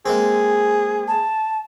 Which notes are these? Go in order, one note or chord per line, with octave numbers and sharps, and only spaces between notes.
G#3 A#3 C4 G#4
A5